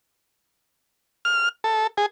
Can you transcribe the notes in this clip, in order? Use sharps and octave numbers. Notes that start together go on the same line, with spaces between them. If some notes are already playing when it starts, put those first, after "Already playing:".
F6
A4
G#4